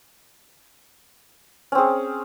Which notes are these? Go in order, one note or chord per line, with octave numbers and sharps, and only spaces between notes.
C4 C#4 G#4